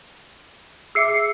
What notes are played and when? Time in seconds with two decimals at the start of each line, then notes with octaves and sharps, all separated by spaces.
0.95 G#4 E5 D6 E6 C7 C#7